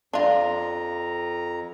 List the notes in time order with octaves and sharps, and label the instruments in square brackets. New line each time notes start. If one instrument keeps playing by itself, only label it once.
[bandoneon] F2 A#5 [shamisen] D4 F4